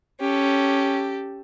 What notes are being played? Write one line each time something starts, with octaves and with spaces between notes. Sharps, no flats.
C#4 G4 A4